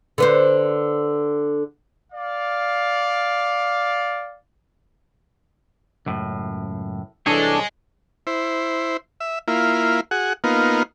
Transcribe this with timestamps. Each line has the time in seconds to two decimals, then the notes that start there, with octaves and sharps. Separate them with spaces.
0.18 D3 B4 C5
2.12 D5 F5
6.06 C#2 F#2 A2
7.27 C2 E3 D4 G#4 A4 C#5 D#5 G#5
8.27 E4 C5
9.20 E5
9.48 A#3 E4 F4
10.11 F#4 G#4 F#5
10.44 A#3 B3 D#4 F4